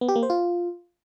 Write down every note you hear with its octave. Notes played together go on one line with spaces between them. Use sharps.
B3
G4
A#3
C5
F4